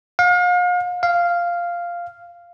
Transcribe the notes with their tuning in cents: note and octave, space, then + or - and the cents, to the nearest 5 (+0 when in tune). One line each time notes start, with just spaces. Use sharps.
F5 +40
F5 -5